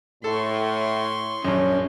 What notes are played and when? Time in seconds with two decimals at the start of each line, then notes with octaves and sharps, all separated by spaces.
0.24 A2 A4 C6 C#6
1.45 A#1 F#2 C#4